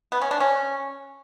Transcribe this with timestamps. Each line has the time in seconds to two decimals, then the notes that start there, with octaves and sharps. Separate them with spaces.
0.12 B3
0.21 C#4
0.31 D4
0.40 C#4